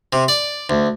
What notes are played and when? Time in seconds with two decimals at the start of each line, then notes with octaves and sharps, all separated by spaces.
0.13 C3
0.28 D5
0.70 D2